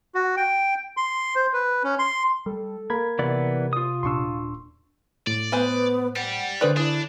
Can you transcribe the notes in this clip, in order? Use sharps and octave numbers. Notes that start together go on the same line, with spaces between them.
F#4
G5
C6
C5
B4
C#4
C6
G3 A4
A#3 A#4 B5 G#6
C3 E3 B3 D5
F4 D#6
D#1 A#2 D4 C6 C#6 E6
A2 D5
B3 B4 C5 G#5
G3 F#5
D3 G#4 B4 C5 D5 F#6
D4 E4 G#4